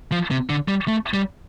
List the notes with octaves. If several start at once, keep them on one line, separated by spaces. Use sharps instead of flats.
F3
C3
D3
G3
A3
G3